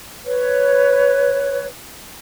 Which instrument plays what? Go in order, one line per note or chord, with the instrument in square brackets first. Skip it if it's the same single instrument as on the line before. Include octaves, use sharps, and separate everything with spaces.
[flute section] B4 C#5